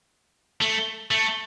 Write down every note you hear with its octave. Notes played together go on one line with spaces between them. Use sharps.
A3
A3